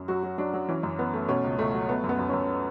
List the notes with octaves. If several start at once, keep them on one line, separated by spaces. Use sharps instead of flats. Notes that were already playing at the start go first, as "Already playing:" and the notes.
Already playing: F#2
F#3 F#4
F#3
F#3 D4
F#3
E3 C#4
F#2
E3 B3
A3
B2 C#4
C#2
C#2 A3
F#3
A3 B3
F#2
B3
F#2
F#2 C#4